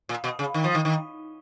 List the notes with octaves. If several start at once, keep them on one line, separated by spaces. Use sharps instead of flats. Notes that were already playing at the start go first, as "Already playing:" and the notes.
A#2
B2
C#3
D#3
F3
D#3
D#3